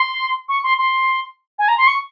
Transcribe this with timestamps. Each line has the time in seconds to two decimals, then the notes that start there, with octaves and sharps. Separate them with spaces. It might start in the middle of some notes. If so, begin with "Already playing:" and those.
Already playing: C6
0.49 C#6
0.64 C6
0.78 C6
1.59 G#5
1.68 A#5
1.78 C6
1.87 C#6